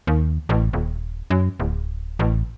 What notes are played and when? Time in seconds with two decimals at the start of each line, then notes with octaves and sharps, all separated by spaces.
0.07 D#2
0.49 A1
0.73 D#1
1.30 F#2
1.60 D1
2.19 A1